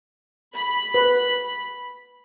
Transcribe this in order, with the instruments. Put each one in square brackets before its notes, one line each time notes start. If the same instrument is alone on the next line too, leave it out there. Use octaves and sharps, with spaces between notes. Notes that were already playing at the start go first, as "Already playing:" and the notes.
[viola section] B5
[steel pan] B4